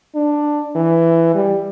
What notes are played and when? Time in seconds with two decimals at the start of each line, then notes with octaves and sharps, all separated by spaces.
0.15 D4
0.76 E3
1.35 G3